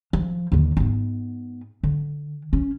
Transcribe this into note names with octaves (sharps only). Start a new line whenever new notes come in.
F3
D#2 D3
G#2 B3
D3
C#4